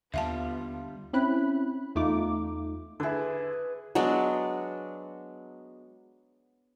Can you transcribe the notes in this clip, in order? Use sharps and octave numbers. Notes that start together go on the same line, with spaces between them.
D#2 D3 G3 B3 F4 E5 F5 A5
C4 C#4 E4 B5 F#6
E2 A3 D#4 F4 D6
D3 E4 G#4 B4
F#3 G#3 B3 D4